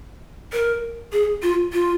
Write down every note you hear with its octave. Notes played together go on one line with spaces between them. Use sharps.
A#4
G#4
F4
F4